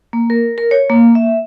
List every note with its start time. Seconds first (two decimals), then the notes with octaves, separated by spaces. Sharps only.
0.13 A#3
0.30 A#4
0.58 A#4
0.71 C#5
0.90 A#3
1.15 E5